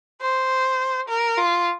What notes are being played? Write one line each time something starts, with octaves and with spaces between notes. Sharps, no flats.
C5
A#4
F4